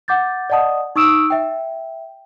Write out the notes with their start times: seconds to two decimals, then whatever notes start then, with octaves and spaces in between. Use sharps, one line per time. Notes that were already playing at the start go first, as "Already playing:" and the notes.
0.08 F#5 D6 G6 A6
0.50 D5 D#5 F#5 A5 D#6
0.96 D#4 C#6 D#6 E6 D7 E7
1.30 E5 G5